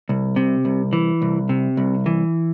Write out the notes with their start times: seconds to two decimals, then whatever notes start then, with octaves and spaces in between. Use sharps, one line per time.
0.09 C2
0.36 C3
0.65 C2
0.93 E3
1.22 C2
1.49 C3
1.77 C2
2.06 E3